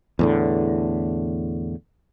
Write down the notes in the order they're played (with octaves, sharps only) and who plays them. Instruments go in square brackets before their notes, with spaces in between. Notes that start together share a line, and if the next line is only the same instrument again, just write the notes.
[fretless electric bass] E2 A2 D3